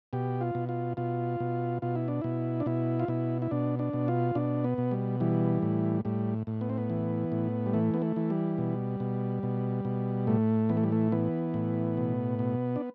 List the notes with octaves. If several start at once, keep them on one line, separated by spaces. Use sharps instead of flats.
B2 G4
F4
B2
F4
B2 F4
B2
B2 F4
E4
D4
B2 E4
D4
B2 E4
F4
B2 E4
E4
B2 D4
D4
B2
F4
B2 D4
B3
B2
G3
E3 G3
A2
A2 G3
A2
B3
C4
B3
E3
A2
G3
E3 A3
B3
A3
E3
G3
B2
B2
B2
B2
A2 A3
E3 B3
A3
G3
A3
E3 B3
A2
B2
B2
D4